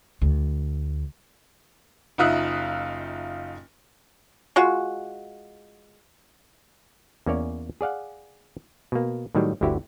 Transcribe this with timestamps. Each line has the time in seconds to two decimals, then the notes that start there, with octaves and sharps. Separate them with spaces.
0.22 D2
2.18 F#1 D#4 F4 E5 D#6 F#6
4.56 G#3 F4 F#4
7.26 E2 A#3 C#4 C#5 D5
7.81 G#4 D5 F5 F#5
8.92 B2 A#3
9.35 A2 D#3 F#3 G3
9.61 G1 D2 D3 E4 F#4 G4